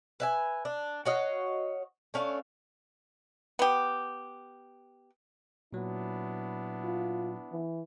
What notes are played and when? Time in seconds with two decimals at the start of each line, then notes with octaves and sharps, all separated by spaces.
0.20 B4 E5 G#5
0.65 D4
1.06 F#4 C#5 D#5 F5
2.14 A3 C#4 D4 F5
3.59 B3 G4
5.73 A#2 F#3 B3 D4 E4
6.84 F4
7.52 E3